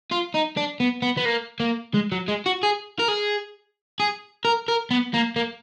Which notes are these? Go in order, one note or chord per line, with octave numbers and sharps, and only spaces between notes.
F4
D#4
D4
B3
B3
B3
A#3
A#3
G#3
F#3
G#3
F#4
G#4
A#4
G#4
G#4
A#4
A#4
B3
A#3
A#3